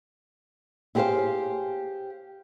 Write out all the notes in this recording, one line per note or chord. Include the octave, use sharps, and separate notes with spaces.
E4 G4 G#4 B4 C5 F5